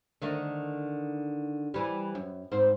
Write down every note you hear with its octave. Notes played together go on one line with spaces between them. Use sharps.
D3 D#3 A3
E3 G3
F#2
G#2 C4 C5